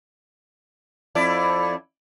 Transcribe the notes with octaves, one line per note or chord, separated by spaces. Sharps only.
F2 E4 D5